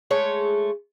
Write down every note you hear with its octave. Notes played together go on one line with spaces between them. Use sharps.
G#3 A3 C#5